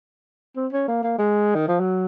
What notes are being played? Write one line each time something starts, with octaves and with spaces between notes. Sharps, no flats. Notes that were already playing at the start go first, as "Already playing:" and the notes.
C4
C#4
A#3
A#3
G#3
D#3
F3
F#3